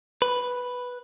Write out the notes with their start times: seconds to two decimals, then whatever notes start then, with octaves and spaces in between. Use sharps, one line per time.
0.22 B4